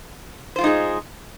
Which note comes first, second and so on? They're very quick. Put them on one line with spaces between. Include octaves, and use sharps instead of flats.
C5 F4 G#3 D#4 G#4